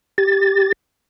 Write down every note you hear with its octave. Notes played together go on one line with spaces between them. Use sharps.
G4 A6